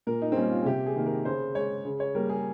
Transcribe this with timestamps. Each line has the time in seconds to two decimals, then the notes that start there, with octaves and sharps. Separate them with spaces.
0.07 A#2 A#4
0.22 D#4
0.32 C4
0.36 G3 A#3 C#4
0.52 F4
0.62 G#4
0.66 C3 G4
0.86 G#4
0.96 D#3 A#3
1.06 A#4
1.25 C#3 C5
1.55 G#3 C#5
1.85 C#3
2.00 C#5
2.15 G3 A#3 A#4
2.30 G#4